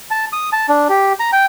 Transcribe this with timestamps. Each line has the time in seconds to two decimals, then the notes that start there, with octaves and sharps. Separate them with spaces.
0.11 A5
0.33 D#6
0.52 A5
0.69 D4
0.89 G4
1.20 A#5
1.33 G5